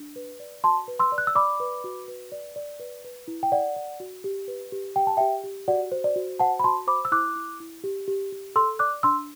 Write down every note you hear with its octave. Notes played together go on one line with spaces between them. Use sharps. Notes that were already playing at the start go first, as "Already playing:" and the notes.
Already playing: D4
B4
D5
F#4 A5 C6
B4
C6 E6
D5
F#6
E6
D5 B5 D6
B4
F#4
B4
D5
D5
B4
B4
E4
G5
D5 F#5
D5
F#4
G4
B4
G4
G4 G5
A5
G4 E5 G5
G4
F#4 D5 F#5
C5
D5
F#4
C5 F#5 A5
B5
F#4 A5 C6
C5 B5 D6
E6
E4 D6 F#6
E4
E4
G4
G4
G4
A4 C6 E6
D5 D6 F#6
D4 C6 E6